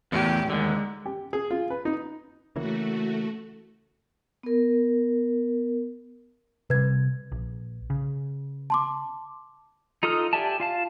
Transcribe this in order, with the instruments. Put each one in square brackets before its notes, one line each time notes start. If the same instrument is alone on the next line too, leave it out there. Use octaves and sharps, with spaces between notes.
[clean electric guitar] E2 A2 [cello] G4
[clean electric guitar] D#2 D3 [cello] G#3
[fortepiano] G4
G#4
F4
B4
D#4
[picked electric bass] C#3 E3 A#3 [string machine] A3 F#4
[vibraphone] B3 A#4
[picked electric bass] C3 G3 [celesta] B4 G#6
[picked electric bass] A#1
C#3
[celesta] A5 C6 D6
[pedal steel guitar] D#4 F4 A4 D#6 F6
G4 D5 E5 G#5 A5
F4 F5 A5